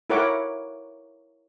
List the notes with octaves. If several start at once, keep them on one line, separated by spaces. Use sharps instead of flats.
E4 A4 A#4 C#5 F#5 D6